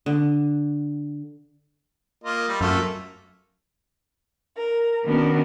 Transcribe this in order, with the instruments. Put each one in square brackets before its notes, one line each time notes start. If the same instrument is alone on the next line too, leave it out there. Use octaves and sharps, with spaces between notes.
[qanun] D3
[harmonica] A#3 F4 D#5
G3
[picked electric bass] F#2 [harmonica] A3 A#3 F4
[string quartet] A#4
D#3 B3 C#4 D4 F#4 A#4